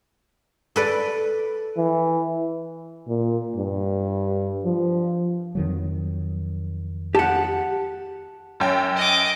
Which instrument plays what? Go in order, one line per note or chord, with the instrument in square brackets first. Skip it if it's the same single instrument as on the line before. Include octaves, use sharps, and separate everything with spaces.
[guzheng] A4 B4 D5
[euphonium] E3
[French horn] A#2
G2
F3
[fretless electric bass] F2 D#3 F#3
[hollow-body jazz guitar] G4 F#5 [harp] A5
[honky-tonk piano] F#2 C#4 G5
[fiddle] D#5 D6